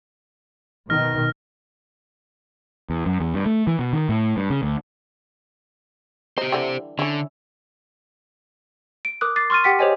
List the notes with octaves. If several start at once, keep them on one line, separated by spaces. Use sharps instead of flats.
B2 D#3 F6 A#6
E2
F#2
E2
G2
A3
E3
B2
D#3
A2
G2
C#3
D2
D#4 G4 C5
D3 E3 G3
D3 C#4 E4
D7
A#4 D6 D#6 F#6
D6 A6 C7
C6 C#6 F6 A6 D#7
G4 F#5 G5 B6
G4 G#4 C5 C#5 D#5 G#5